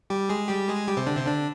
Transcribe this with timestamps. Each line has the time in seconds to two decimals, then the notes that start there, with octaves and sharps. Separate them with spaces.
0.10 G3 G4
0.29 G#3 G#4
0.48 G3 G4
0.68 G#3 G#4
0.88 G3 G4
0.97 C3 C4
1.07 D3 D4
1.17 C3 C4
1.26 D3 D4